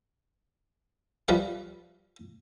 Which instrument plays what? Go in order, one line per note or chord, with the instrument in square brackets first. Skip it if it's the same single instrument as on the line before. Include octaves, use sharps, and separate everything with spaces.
[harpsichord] F3 G3 B4 E5 F5